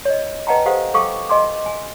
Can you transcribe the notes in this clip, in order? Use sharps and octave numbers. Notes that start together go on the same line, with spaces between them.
C#5 D#5
B4 D#5 F#5 G5 A5 A#5
G4 A4 C5 F5 F#5
A4 F5 G5 C#6 D6
D#5 G#5 C6 D6
G#5